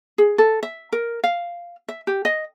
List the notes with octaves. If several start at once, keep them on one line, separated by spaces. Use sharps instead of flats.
G#4
A4
E5
A#4
F5
E5
G4
D#5